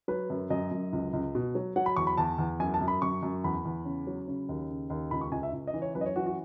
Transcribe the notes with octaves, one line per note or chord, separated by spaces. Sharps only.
F#3 B4
F#2
F#2 D#5
F#2
C#2
C#2
B2
F#3
F#3 F#5
B5
E2 C#6
B5
E2 A5
E2
F#2 G#5
A5
F#2
B5
F#2 C#6
F#2
E2 B5
E2
C#3
F#3
C#3
D#2
C#3
D#2
C#2 B5
C#6
C#2 G#5
E5
C#2
D#5
E3
C#5
F#2 B4
D#5
C#5
E3 F#4
F#4